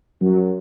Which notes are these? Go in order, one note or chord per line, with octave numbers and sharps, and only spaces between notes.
F#2 F#3